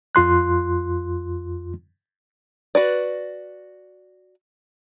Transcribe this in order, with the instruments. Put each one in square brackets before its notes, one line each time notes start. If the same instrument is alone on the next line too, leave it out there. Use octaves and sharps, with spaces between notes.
[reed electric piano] F2 F4 C6 F#6
[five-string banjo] F#4 B4 D5